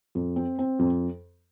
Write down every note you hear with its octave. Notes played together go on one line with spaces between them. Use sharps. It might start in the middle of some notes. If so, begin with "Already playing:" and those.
F2
C4
C4
F2